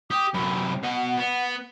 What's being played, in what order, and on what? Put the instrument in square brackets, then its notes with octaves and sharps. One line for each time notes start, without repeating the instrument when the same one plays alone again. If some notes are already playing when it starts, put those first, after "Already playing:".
[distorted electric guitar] G4 [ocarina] D#6
[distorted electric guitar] F#2 C3 [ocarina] B5
[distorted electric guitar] B2 D#5 [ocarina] F#5
[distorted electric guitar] B3